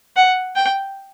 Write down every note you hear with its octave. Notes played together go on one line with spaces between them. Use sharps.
F#5
G5